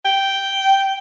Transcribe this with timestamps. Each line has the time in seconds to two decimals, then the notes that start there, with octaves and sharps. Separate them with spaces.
0.05 G5